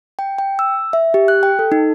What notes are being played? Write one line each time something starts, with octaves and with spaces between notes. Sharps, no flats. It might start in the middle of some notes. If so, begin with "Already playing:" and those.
G5
G5
E6
E5
G4
F#6
G5
A4
D#4